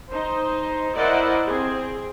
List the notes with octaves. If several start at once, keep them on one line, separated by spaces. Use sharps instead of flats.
D#4 C5
E4 A#4 C5 D5 D#5 F#5
C4 G#4